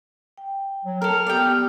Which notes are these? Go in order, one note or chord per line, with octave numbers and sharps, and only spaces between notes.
G5
F#3
A4 A#4 F6
B3 G4 D5 G5 D#6